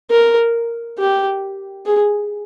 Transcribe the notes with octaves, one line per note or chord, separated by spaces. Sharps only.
A#4
G4
G#4